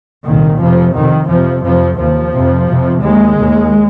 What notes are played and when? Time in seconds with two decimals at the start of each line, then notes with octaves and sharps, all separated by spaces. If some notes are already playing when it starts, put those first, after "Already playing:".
0.25 C2 A#2 D#3
0.59 F2 C3 F3
0.94 F2 C3 D#3
1.28 F2 C3 F3
1.64 F2 C3 F3
1.98 D#2 F3
2.33 F2 C3
2.68 F2 C3
3.01 D#2 G#3
3.37 D#2